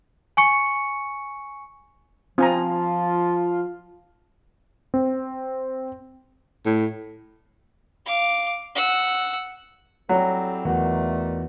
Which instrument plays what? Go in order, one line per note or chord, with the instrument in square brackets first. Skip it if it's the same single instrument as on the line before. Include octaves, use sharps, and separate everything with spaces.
[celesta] G#5 C#6 C#7
[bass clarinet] F3 [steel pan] C4 G#5 A#5 [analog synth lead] F4
[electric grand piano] C4
[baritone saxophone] A2
[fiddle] F5 D6
F#5 E6
[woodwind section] A2 G3 C4 [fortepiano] F#3
[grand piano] E2 F#4 F#5 [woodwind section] A#2 D#3 A3